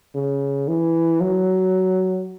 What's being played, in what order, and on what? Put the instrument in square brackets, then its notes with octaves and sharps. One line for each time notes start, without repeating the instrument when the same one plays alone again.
[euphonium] C#3
E3
F#3